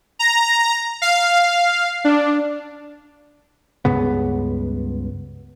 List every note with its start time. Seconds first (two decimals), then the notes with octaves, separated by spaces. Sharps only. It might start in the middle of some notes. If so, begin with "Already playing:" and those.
0.19 A#5
1.02 F5
2.04 D4
3.85 C#2 G2 C#3 B3